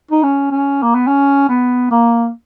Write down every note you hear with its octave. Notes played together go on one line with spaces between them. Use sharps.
D#4
C#4
C#4
A#3
B3
C#4
B3
A#3